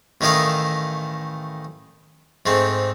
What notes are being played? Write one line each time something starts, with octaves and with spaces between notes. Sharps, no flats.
A1 D#3 A3 E4 D#5 F5
G#2 A3 C4